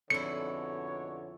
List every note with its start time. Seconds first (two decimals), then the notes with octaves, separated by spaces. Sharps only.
0.10 F2 G#2 B2 D3 E4 C#5 C#7